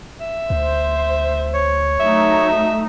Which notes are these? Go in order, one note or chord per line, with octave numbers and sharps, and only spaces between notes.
E5
D2 C5
C#5
F#3 A3 D#4 E5